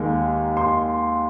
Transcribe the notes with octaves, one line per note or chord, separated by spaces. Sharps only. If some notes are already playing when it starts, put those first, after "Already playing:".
Already playing: D#2 D#3 G#3
C6